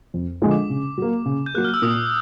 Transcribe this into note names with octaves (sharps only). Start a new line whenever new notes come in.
F2
D3 F3 G#3
D6
C#3
F#3 A#3
C#3
G6
F#3 A#3 F#6
F6
E6
A#2 D#6